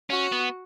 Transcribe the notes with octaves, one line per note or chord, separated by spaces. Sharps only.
C#4 F#4
B3